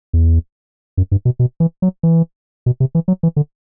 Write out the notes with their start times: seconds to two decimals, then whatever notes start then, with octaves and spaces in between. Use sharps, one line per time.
0.13 E2
0.97 F#2
1.12 G2
1.25 B2
1.39 B2
1.60 E3
1.82 F#3
2.03 E3
2.66 B2
2.80 C3
2.95 E3
3.08 F#3
3.23 E3
3.36 D3